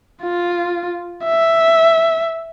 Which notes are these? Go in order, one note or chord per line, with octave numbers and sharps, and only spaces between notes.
F4
E5